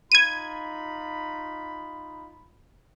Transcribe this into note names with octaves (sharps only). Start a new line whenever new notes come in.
D#4 F4 B5 G#6 D#7